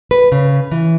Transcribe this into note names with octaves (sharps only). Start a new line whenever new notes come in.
B4
C#3
E3